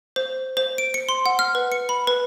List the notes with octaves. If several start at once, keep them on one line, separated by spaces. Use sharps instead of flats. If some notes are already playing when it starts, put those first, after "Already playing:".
C5
C5
D7
C#7
C6
F#5
F6
B4
C#7
B5
B4